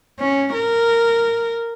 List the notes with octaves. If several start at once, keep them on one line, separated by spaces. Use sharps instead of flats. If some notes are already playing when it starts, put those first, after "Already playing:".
C#4
A#4